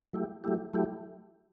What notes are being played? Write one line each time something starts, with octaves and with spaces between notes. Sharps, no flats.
F#3 A3 E4 G4
F#3 A3 E4 G4
F#3 A3 E4 G4